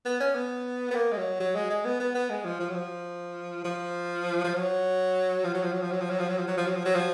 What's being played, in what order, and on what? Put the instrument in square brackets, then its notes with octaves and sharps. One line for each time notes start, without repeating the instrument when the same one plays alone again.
[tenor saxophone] B3
C#4
B3
B3
A#3
G#3
F#3
F#3
G#3
G#3
B3
B3
B3
G#3
F3
F3
F#3
F3
F3
F3
F#3
F3
F#3
F3
F#3
F3
F#3
F3
F#3
F3
F#3
F3
F#3
F3
F#3
F3
F#3
F3